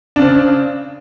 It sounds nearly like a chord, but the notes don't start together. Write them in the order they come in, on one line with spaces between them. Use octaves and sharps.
D4 C#3 C4